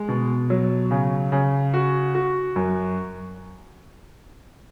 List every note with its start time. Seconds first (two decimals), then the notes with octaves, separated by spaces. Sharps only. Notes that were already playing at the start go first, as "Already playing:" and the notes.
Already playing: G#3
0.09 B2
0.50 F#3
0.91 C#3
1.32 C#3
1.74 F#4
2.15 F#4
2.56 F#2